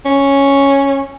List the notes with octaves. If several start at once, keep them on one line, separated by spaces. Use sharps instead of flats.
C#4